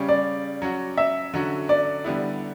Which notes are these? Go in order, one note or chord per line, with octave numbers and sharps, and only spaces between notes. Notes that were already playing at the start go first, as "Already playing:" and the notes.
Already playing: C#3 G3 C#4
D5
F#3 C#4 F#4
E5
D3 F#3 C#4 F#4
D5
D3 G3 B3 E4